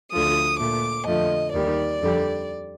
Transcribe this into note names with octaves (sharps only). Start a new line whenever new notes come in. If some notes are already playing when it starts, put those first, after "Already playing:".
D2 D3 F3 D#6
A#2 A3 D6
F2 D3 F3 A3 D#5
D#2 D#3 G3 D5
F2 D3 G3